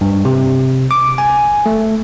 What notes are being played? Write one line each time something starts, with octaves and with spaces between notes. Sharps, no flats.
G2
C3
D6
G#5
A3